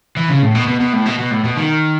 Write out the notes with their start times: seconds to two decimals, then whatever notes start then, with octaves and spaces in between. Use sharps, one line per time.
0.17 E3
0.29 C#3
0.42 A2
0.55 B2
0.68 B2
0.81 B2
0.93 A2
1.06 B2
1.19 B2
1.32 A2
1.44 B2
1.57 D#3